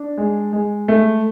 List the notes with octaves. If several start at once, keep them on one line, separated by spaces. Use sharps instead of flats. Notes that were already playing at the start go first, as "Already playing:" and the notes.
Already playing: D4
G#3
G#3
A3